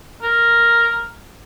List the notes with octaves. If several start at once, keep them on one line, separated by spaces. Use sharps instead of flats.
A#4